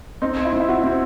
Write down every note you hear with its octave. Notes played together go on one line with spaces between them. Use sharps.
C4 D#4
E4
C4
E4
F#4
C4